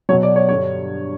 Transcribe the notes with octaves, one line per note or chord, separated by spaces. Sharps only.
B2 F#3 C#5
D5
C#5
G2 D3 G3 C#5